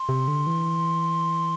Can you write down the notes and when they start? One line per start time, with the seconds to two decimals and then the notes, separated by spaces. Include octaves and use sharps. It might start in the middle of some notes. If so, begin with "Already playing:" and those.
Already playing: C6
0.09 C3
0.28 D3
0.47 E3